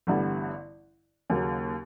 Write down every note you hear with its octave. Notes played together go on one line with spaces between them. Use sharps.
A1 G2 D3 G3 B3
D#2 C#3 F#3 A#3